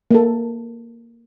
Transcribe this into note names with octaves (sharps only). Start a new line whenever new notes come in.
A#3 A4